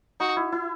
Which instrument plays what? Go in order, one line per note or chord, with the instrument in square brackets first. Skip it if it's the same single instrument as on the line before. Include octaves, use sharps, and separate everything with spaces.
[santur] D#4 [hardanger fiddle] F#4
[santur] E4
E4